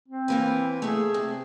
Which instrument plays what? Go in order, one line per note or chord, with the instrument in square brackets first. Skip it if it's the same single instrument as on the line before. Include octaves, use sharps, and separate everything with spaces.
[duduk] C4
[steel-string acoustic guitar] E3 A#3 B4
[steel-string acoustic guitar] A3 E5 [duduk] G#4
[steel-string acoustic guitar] C3